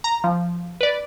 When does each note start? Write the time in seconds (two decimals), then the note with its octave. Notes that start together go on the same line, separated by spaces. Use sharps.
0.04 A#5
0.24 F3
0.81 B4 D5